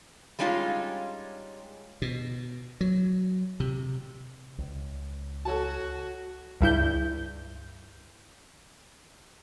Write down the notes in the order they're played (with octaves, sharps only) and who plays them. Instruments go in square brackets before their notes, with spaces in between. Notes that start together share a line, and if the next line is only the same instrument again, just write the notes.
[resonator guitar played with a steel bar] G3 G#3 C#4 D#4 F4
[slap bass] B2
F#3
C3
[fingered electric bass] C#2
[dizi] F#4 [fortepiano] A4 C#5 A5
[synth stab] C#2 G2 E4 G6